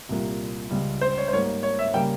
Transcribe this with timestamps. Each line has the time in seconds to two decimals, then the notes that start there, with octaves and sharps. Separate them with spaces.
0.09 C2 A#2 G3 A#3
0.71 C#2 C#3 G3
1.01 C5
1.18 C#5
1.28 C5
1.33 G#2 G3 A#3 C#5
1.63 C#5
1.79 E5
1.94 C#3 G3 A#3 G5